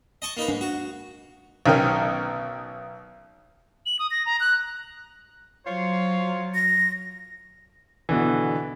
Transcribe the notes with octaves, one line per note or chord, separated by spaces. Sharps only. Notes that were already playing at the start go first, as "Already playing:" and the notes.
D#5 A5 C#6
A#3 D#4 B4
G#2 D4
F#4
B1 D#3 C#4 A#4 G5
F#7
D#6
A#6
A#5
F#6
F#3 F4 C5 C#5
A#6
B2 D3 E3